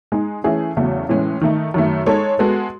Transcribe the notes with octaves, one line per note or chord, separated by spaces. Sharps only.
G#3 D#4 G#4
E3 A3 C#4 E4 G#4
E2 C#3 F#3 A3
A2 E3 G#3 C#4
D#3 A3 D#4
F#2 D#3 A3
G#3 D#4 A4 C#5
G#3 B3 F#4 A4